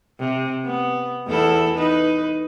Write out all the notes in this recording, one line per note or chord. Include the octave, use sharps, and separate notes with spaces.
C3
B3
E2 E4 A4
D#4 B4